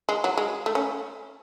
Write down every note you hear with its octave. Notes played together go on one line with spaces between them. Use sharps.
G#3
F#3
G#3
A3
C#4